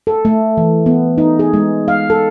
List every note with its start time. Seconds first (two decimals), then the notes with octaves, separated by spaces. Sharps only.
0.07 A4
0.25 A3
0.57 E3
0.86 B3
1.18 D#4
1.39 G#4
1.53 G#3
1.88 F5
2.10 A4